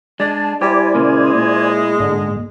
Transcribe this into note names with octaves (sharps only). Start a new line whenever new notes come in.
G#3 D4 A5
G3 E4 G4 C5 D5 G#5
A#2 C#3 G#3 A#3
A#2
G#2 D3